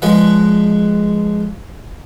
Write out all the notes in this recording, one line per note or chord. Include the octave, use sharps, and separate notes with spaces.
F3 G#3 B4